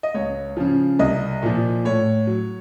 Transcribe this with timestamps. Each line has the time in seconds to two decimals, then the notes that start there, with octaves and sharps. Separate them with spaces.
0.03 D#5
0.14 C#2 C#5
0.57 C#3 F3
0.99 C2 D#5
1.43 A#2 F3
1.85 A2 C#5
2.27 F#3